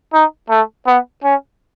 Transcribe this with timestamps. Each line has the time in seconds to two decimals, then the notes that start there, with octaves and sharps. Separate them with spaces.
0.13 D#4
0.50 A3
0.87 B3
1.24 C#4